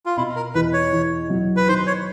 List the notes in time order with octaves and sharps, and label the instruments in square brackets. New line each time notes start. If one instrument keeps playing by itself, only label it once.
[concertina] F4
[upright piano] B2 [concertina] E4
[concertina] A#4
[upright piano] E2 [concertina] B4
[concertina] C#5
[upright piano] E2
F#3
[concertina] B4
[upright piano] D#3 [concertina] C5
[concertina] C#5